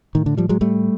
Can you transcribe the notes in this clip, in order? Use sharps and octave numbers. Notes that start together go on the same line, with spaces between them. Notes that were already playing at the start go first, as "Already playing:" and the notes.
A2 D#3
D3
F3 G3
F#3 G#3
G3 A3